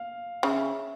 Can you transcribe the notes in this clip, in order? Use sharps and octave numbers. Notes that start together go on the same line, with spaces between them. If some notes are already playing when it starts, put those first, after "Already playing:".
Already playing: F5
C#3 E5